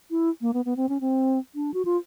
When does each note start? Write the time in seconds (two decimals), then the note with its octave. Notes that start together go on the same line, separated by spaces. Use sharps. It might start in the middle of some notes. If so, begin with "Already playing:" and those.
0.11 E4
0.41 A#3
0.54 B3
0.65 B3
0.77 C4
0.89 C#4
1.01 C4
1.55 D4
1.74 F#4
1.85 F4